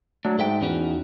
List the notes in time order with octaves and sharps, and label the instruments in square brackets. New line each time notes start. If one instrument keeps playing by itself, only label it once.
[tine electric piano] F#3 D4 [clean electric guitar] A3
[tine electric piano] G#2 [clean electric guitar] A4 E5 G5
[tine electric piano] E2 [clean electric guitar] C#4 D#4 F#4